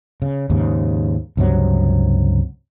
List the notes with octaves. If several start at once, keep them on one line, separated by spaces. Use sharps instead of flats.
C#3
D#2 G#2 C#3
C#2 G2 C3 F#3